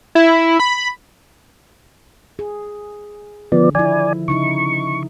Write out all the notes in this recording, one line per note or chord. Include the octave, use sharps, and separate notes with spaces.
E4
B5
G#4
D3 D#3 F3 B3 D5
F3 E4 D5 G#5
C#3 D#4 E4 C#6